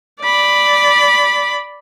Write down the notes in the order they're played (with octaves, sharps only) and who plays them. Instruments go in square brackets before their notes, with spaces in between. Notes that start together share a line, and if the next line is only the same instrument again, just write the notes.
[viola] D5 B5